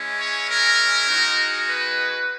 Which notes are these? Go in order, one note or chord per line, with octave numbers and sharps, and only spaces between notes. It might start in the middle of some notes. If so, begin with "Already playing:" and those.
Already playing: G#3 C#4 E4
C#5
A#4
G#3 D#4 F#4
B4